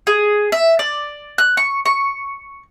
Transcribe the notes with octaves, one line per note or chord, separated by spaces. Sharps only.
G#4
E5
D5
F#6
C#6
C#6